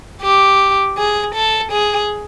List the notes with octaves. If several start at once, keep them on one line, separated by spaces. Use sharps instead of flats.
G4
G#4
A4
G#4